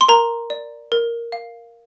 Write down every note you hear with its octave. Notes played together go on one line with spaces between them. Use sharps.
C6
A#4 A#5
D5
A#4
F5